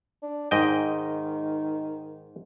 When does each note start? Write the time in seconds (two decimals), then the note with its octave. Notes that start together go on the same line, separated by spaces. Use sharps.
0.22 D4
0.51 G#2 D#3 D#5 G5